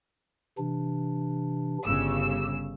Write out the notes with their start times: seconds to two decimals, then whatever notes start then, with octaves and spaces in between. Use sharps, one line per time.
0.58 C3 E3 D4
1.85 G1 C#3 G4 E6